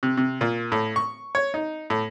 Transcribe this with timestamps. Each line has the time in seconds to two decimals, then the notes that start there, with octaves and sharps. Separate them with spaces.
0.03 C3
0.17 C3
0.41 A#2
0.72 A2
0.96 C#6
1.35 C#5
1.54 D#4
1.90 A2